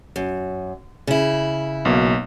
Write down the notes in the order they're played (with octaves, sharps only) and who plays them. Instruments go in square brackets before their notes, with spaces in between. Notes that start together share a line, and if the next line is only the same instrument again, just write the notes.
[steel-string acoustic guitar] F#2
C#3 E4
[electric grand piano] B1 B2 A#3